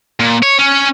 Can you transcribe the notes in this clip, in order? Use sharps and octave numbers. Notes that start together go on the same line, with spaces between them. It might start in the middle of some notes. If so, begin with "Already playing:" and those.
A#2
C#5
C#4